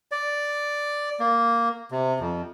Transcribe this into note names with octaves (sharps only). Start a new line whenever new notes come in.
D5
A#3
C3
F2